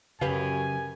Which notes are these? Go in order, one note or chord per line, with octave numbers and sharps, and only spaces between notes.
F#2 C#3 F#3 G4 B4 F5 G#5